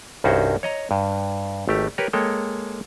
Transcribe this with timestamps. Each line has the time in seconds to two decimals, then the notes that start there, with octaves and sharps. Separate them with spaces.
0.24 C2 G2 C#4 D#4 F#4 C5
0.63 C#5 D#5 A#5
0.91 G2
1.68 G#1 A3 G4
1.98 G4 A#4 B4 C#5
2.13 G#3 A#3 A4 C#5 G5